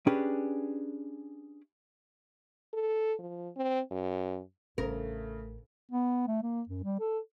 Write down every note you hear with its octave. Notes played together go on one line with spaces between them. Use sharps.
C#4 D4 G4 G#4 B4
A4
F3
C4
F#2
A1 C#3 A3 A#4
B3
A3
A#3
F#2
G3
A4